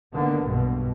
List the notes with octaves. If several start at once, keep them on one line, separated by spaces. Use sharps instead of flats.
D3 D#3 A#3 B3
B1 G2 B2